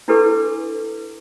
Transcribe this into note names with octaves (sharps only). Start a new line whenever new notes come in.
D4 E4 G4 A4 B4 D6